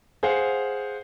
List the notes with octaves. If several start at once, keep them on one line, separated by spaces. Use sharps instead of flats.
G#4 C5 F5 F#5